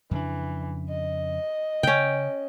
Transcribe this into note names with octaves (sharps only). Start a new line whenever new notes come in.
F2 C#3 E3 D4
D#5
C#3 C#4 G5